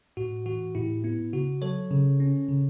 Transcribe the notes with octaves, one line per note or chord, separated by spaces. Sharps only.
A2 F#4
E3 F#4
A2 E4 G4
B3 E4
C#3 F#4
F#3 A4 C#5
C#3
C#4
C#3